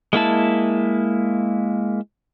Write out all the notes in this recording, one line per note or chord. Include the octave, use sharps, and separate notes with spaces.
G#3 A#3 E4 A5